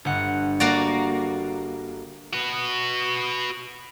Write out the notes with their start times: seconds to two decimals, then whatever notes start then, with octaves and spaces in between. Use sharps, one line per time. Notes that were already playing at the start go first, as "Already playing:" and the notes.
0.05 G1 F#5
0.60 A#3 F#4 D5
2.33 F#4 B4